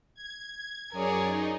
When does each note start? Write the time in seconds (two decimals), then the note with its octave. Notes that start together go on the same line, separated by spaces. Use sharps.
0.15 G#6
0.92 F#2 G#4 A#4 C#5 D5
1.27 D#4